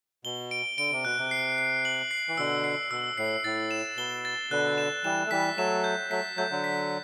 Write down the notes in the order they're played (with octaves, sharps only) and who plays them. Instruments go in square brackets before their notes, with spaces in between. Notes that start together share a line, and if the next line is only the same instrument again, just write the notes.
[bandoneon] B2 [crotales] G7
[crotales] D7
[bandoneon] D3 [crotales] D7
[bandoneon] C3
[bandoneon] B2 [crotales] F#6
[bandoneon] C3
[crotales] C7
C7
F#7
C7
[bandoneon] E3
[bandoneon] B2 D3 [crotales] E6
[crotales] C7
[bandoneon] B2 [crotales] E6
[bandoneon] A2 [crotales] C7
[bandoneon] A2 [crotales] A6
[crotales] E7
[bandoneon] B2 [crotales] G7
[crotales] A6
[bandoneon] B2 D3 [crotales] F#6
[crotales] E7
[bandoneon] E3 G3 [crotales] E7
[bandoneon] A3
[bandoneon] E3 G3 [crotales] B6
[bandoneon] F#3 A3 [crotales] E7
[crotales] G6
[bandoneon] F#3 A3 [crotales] B6
[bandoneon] F#3 A3 [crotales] G6
[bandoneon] D3 F#3
[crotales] B6